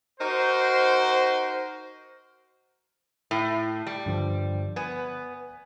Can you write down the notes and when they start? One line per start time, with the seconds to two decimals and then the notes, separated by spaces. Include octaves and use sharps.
0.20 D#4 F#4 A#4 C5
3.31 A2
3.87 G3
4.06 G2 D3 F3
4.76 B3 G#5